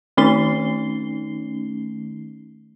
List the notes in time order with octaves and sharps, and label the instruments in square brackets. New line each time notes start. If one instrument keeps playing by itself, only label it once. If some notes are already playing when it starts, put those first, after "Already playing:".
[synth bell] D#3 A3 C#4 D#4 C7 G7